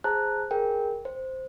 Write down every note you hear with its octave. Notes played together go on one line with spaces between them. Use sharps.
G#4 C5 A5 A#5 F#6
G#4 A#4 G5
C5